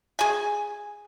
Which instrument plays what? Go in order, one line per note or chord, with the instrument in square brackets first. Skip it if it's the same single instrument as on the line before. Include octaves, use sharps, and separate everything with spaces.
[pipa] G#4 G#5